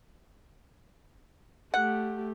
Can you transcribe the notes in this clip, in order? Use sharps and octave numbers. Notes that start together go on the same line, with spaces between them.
A3 G4 F#5